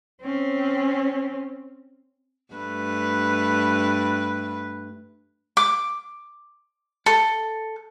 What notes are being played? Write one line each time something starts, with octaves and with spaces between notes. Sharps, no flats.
C4 C#4
G2 A3 B4
D6
A4